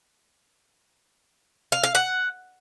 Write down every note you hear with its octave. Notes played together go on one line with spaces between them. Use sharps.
F5
F5
F#5